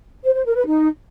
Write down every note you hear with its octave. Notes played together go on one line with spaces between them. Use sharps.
C5
C5
A#4
B4
D#4